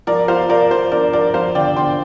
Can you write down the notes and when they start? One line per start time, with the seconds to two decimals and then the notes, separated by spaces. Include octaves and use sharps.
0.07 F3 A#4 D5
0.28 F4 C5 F5
0.49 F3 A#4 D5
0.71 F3 C5
0.92 D4 A#4 D5
1.13 F3 A#4 D5
1.34 F3 C5 F5
1.55 D3 D5 G5
1.76 D3 G5 C6